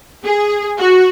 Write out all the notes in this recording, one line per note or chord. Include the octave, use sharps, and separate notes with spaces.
G#4
F#4